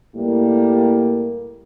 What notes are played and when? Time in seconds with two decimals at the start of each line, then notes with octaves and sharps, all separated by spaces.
0.16 A2 G3 A#3